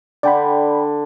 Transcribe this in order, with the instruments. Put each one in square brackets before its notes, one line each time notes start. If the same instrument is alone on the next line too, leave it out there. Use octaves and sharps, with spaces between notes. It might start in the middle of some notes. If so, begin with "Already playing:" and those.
[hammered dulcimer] D3 [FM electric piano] D5 G5 B5